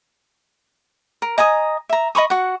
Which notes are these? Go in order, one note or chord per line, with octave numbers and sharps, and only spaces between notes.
A#4
D#5 G#5 A#5 D#6
E5 A#5
D#5 B5 C#6 D#6
F#4 F#5